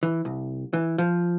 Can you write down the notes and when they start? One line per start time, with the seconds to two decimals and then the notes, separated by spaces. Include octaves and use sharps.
0.03 E3
0.25 C2
0.73 E3
0.98 F3